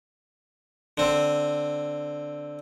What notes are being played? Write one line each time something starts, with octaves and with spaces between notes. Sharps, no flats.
D3 C4